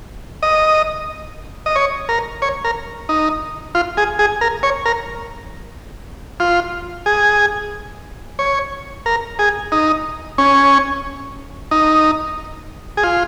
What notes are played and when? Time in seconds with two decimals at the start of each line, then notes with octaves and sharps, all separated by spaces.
0.43 D#5
1.66 D#5
1.76 C#5
2.09 A#4
2.42 C#5
2.64 A#4
3.09 D#4
3.75 F4
3.97 G#4
4.19 G#4
4.41 A#4
4.63 C#5
4.86 A#4
6.40 F4
7.06 G#4
8.39 C#5
9.06 A#4
9.39 G#4
9.72 D#4
10.38 C#4
11.71 D#4
12.97 G#4
13.04 F4